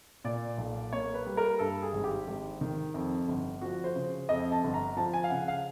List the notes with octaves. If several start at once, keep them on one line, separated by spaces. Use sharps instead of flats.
A#2 D5
B1
A#3 C#5
B4
G3
A#4
G2 A4
G#4
G#1
G4
G#1
D#3
F2
G1
F3 F#4
C5
C#3
F2 D#5
A5
G1
A#5
F3 A5
G#5
F5
C#3 F#5
F5